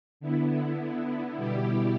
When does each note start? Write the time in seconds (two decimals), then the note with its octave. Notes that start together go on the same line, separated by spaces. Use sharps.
0.20 D3 B3 E4
1.37 B2 G3 E4 G4